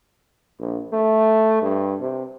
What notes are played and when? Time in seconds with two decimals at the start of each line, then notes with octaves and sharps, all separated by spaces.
0.59 A#1
0.93 A3
1.62 G2
2.00 C3